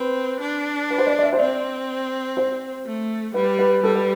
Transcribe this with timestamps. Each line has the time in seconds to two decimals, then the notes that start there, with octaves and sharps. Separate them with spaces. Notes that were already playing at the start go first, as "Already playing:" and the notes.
Already playing: C4 B4
0.41 D4
0.90 B4
0.98 C5
1.07 D5
1.19 D5
1.23 E5
1.33 C5
1.39 C4 D5
2.37 C5
2.86 A3
3.34 G3 B4
3.59 B4
3.83 G3 A4
3.96 B4